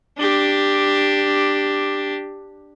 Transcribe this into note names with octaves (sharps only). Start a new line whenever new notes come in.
D4 G4